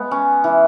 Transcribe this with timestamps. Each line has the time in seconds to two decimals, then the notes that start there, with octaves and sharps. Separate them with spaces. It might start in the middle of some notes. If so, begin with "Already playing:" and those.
Already playing: G#3 B3
0.11 C#4
0.44 E3